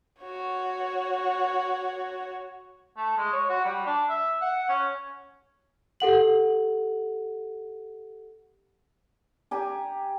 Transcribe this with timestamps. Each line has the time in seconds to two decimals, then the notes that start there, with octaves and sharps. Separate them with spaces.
0.22 F#4 C#5
2.97 A3
3.17 G#3
3.33 C#5
3.49 F#4
3.65 G3
3.86 D4
4.09 E5
4.41 F#5
4.69 C#4
6.00 G4 A4 F#5 F#7
9.51 G4 G#5 A#5